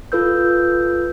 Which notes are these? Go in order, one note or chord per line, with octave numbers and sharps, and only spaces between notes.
F4 A4 B4 E6 G6